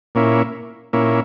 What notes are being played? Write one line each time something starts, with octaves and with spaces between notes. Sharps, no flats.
A#2 A#3 C#4 E4
A#2 A#3 C#4 E4